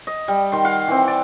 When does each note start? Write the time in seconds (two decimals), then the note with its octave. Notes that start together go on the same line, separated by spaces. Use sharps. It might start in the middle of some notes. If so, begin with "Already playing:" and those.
0.07 D#5
0.28 G3
0.52 D#3 C6
0.65 F5 F#5
0.88 E3 C4
1.08 D5